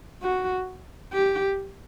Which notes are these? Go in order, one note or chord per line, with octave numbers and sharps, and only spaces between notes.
F#4
G4